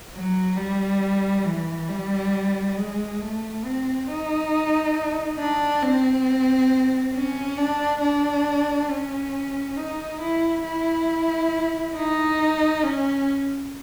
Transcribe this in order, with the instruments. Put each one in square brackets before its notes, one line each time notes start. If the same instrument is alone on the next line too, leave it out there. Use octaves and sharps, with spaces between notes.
[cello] F#3
G3
E3
G3
G#3
A3
C4
D#4
D4
C4
C#4
D4
D4
C#4
D#4
E4
E4
D#4
C#4